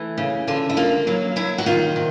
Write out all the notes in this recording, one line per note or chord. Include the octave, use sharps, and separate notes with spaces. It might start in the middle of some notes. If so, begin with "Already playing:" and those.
Already playing: E3 A3
C#3
D3 F4
E4
A#3 F4
F#3 E4
F#3 E4
F#4
D#3 F4
C3